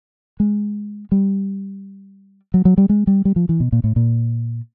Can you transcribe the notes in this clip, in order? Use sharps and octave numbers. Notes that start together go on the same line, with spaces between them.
G#3
G3
F#3
F#3
G3
G#3
G3
G3
F3
E3
B2
A#2
A2
A#2